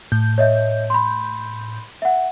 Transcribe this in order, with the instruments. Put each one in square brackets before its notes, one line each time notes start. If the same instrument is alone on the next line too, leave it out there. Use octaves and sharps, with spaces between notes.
[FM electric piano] A2 G6
[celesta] C#5 D#5 E5
B5 C6
E5 F#5